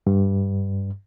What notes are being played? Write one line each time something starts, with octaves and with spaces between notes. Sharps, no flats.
G2